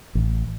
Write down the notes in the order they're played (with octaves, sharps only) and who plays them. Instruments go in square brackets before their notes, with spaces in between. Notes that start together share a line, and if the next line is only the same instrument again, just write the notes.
[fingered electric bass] A1